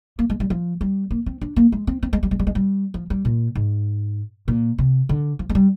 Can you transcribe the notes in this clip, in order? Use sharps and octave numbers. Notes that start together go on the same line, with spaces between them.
A#3
G#3
G3
F3
G3
A#3
C4
D4
A#3
G#3
C4
C4
G#3
G3
G#3
G3
G#3
G3
F3
G3
A#2
G#2
A#2
C3
D3
F3
G#3
G3